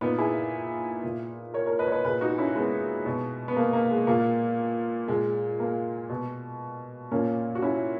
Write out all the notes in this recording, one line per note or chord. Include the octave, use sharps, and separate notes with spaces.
A#2 B3 D#4
E4 G#4
A#2
A#4 C#5
A#4 C#5
B4 D#5
C#5
B4 D#5
A#2 G#4 B4
D#4 F#4
C#4 E4
G#3 B3
B2
B3
A#3
A#3
G#3
A#2 A#3
A#2 G#3
A#3
B2
A#2 A#3 C#4
F#4
C#4 E4